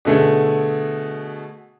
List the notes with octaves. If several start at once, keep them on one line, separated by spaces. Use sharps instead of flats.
B2 D3 A3 G#4